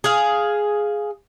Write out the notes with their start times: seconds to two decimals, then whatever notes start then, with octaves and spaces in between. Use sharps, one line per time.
0.04 G#4 F5